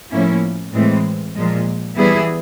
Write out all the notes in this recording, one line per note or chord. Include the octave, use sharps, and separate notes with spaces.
A2 F3 A#3 C#4 E4
A2 E3 G#3 C4
A#2 F3 G#3
E3 G3 B3 E4 G#4